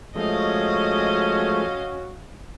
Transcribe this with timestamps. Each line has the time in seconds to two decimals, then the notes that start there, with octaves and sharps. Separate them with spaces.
0.16 F3 G#3 A3 C#4 F#4 D#5 F5